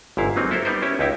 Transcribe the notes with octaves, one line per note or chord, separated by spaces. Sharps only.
G1 G#2 E4 F5
F#3 A#3 C4 D#4
E4 A4 A#4 C5
G3 B3 D#4 A#4 C5
C#4 E4 G4
C#2 D#4 E4 G4